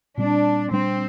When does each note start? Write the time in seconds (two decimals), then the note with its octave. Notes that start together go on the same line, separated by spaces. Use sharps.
0.17 A#2 G3 C4 D4
0.71 A#2 G3 C4 D4